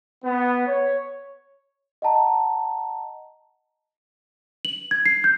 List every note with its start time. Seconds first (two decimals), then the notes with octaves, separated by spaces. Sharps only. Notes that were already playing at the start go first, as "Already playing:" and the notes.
0.25 B3
0.67 C#5
2.02 D#5 F#5 A5 A#5
4.65 F#7
4.91 G#6
5.06 C7
5.24 G6